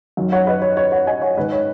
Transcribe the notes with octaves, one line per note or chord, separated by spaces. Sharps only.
F#2 D#3
C#5 F#5
B4 D#5
C#5
C#5
C#5 F#5
D#5 G#5
C#5 F#5
G#2 D#3 B4 D#5
C#5